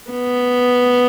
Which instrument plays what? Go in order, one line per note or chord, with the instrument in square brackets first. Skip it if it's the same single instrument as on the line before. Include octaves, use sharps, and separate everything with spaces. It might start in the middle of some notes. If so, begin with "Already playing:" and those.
[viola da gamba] B3